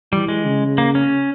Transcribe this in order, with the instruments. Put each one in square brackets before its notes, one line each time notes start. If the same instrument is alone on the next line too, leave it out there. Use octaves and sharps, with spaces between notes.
[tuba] E3 [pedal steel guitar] G3
[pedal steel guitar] G#3
[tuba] C#3
[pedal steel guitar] A#3
C#4